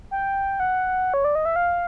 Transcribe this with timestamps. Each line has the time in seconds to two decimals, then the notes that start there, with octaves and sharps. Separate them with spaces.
0.11 G5
0.60 F#5
1.14 C#5
1.24 D5
1.35 D#5
1.45 E5
1.56 F5